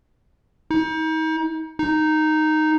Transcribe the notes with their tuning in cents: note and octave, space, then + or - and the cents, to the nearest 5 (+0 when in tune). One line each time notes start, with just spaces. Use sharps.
D#4 +35
D#4 -5